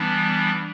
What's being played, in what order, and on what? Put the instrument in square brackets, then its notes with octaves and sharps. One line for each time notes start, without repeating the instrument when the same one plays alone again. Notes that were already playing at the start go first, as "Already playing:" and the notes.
Already playing: [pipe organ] E3 G3 B3 D4